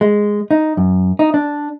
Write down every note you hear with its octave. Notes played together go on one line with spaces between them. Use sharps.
G#3
D#4
F#2
D#4
D4